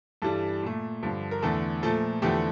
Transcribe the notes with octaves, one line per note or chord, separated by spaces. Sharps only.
G2 E3 G3 A4
A#2 A3
G2 D3 F3
A#4
E2 D3 A3 A4
A#2 F3 A3 A4
E2 D3 F3 A3 G4